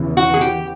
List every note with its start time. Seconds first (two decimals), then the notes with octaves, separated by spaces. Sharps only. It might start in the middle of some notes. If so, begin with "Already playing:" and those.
Already playing: E2 C#3 E3
0.17 F#4
0.34 G#4
0.41 G4